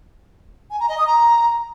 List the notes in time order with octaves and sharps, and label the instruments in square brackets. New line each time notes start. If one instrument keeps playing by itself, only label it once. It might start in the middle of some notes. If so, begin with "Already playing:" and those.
[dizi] G#5
A#5
D#5
D#6
A#5